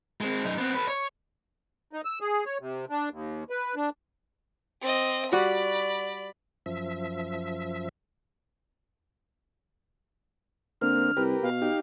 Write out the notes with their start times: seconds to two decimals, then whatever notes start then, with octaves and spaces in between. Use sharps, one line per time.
0.21 G#3 C4
0.44 F#2 D#4
0.58 B3 C4
0.75 A4 B4
0.88 C#5
1.93 D#4
2.05 E6
2.21 G#4
2.46 C#5
2.60 C3
2.89 D4
3.10 D#2
3.50 B4
3.75 D4
4.82 C4 D#5
5.32 G3 F#4 D5 B5
6.66 F#2 F3 E5
10.82 D3 A#3 C4 F6
11.17 C2 G4 A#4 B4
11.43 B2 F5
11.62 D#4 G4